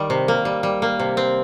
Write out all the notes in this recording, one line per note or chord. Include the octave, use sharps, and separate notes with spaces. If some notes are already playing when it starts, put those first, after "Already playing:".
Already playing: D#3 G3
C3
A#3
G3
G3
A#3
C3
C4